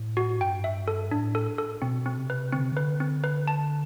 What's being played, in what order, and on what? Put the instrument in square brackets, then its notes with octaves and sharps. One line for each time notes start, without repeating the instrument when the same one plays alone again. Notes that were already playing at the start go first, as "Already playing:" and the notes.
Already playing: [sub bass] A2
[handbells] F#4
[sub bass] G2 [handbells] G5
[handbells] E5
A4
[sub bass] A2 [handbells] D4
[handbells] A4
A4
[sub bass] B2 [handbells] C4
[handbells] C4
[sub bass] C3
[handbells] B4
[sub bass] D3 [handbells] C4
[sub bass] C3
[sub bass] D3 [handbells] B4
[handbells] C4
B4
A5